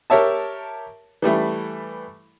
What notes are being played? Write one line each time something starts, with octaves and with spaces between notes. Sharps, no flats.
G4 A#4 C#5 E5 A5
E3 G3 A3 E4